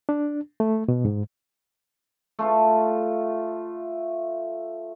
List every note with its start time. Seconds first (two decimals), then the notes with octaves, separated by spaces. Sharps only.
0.09 D4
0.60 A3
0.88 B2
1.05 G#2
2.39 A3 F4 A4